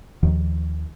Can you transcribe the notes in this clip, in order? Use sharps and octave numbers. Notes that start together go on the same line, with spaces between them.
D#2 D#3 F3